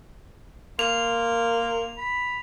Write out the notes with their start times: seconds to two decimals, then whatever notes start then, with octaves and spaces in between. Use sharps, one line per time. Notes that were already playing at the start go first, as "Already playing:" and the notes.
0.79 A#3 C6 F7
1.97 B5